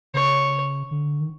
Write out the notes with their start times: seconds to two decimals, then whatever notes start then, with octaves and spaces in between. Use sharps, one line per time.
0.14 C#3 C#5
0.91 D3
1.20 D#3